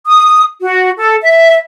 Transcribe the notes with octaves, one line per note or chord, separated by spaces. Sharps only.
D#6
F#4
A4
E5